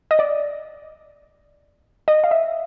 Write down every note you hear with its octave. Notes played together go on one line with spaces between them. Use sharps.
D#5
D5
D#5
F5
E5